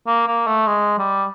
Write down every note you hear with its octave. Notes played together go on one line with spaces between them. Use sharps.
A#3
A#3
A3
G#3
G3